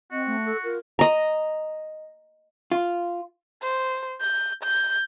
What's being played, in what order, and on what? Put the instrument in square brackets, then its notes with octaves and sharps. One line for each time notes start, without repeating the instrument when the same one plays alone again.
[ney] C4 [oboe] F#4 [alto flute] D#5
[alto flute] A3
[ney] A4
[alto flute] F4 [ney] A#4
[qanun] D#5 A#5
[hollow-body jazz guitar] F4
[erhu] C5
G6
G6